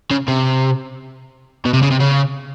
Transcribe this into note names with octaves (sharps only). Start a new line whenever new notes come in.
C#3
C3
B2
C3
C#3
C3
C#3